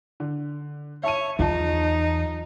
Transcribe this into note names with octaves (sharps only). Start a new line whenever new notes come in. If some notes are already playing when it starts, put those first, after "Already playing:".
D3
C#5 E5 A5 D#7
B1 E2 F3 D#4 A5